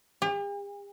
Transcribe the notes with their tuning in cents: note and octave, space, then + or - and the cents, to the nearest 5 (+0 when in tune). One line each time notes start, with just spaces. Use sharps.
G4 +45